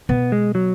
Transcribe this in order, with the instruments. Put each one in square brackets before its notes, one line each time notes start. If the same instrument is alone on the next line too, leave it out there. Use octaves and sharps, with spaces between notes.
[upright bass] B2 [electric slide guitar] B3
[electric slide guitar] G#3
F#3